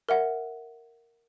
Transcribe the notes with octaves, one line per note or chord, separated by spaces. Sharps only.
A#4 E5 F#5